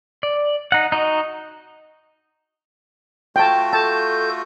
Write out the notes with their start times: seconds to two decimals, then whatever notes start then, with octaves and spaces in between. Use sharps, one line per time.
0.23 D5
0.72 D#4 F#5
0.92 D#4 F#4 D#5
3.36 A3 F4 F#4 G5 A5
3.73 A4 A5 G6